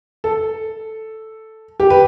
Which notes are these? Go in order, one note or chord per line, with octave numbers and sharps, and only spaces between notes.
A4
G4
B4